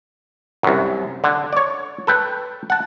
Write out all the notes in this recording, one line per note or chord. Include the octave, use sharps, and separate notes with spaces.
C2 F#2
D3
C#5 D5
A4 B4 G5
F#5 A5